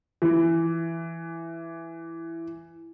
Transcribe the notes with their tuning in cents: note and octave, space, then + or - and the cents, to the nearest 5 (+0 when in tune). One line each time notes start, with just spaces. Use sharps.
E3 +10